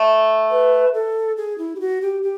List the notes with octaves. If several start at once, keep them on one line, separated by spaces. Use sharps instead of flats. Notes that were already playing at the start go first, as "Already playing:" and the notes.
Already playing: A3
B4
A4
G#4
E4
G4
F#4
G4
G4